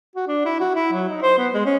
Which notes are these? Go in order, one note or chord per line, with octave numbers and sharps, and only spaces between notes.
F#4
D4
E4
F#4
E4
F#3
D#4
C5
B3
G#3
C#4